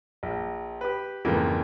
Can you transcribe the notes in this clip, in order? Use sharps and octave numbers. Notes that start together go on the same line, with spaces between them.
A#1
G4 B4
F2 G#2 C#3 E3 A3 A#3